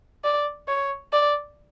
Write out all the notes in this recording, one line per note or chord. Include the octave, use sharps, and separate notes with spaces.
D5
C#5
D5